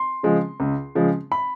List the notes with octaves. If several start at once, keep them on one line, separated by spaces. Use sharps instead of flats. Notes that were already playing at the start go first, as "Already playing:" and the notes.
Already playing: C6
C#3 F3 G#3
C#2
C#3 F3 G#3
B5